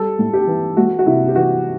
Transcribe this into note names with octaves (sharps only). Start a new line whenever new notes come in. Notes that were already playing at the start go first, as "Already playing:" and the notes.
Already playing: G3 A4
A2
G4
E3
A3 F#4
F#4
C3 E4
G4
E3 F#4